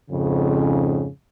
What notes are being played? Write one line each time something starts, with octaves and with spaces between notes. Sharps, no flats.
F2 G#2 C#3